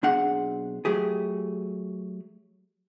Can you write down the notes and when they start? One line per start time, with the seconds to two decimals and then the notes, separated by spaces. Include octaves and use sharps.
0.03 B1 C4 D4 G#4 F#5
0.85 F#3 A3 G4 G#4